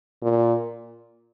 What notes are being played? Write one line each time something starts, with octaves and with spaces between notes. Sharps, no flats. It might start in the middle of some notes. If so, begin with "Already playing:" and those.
A#2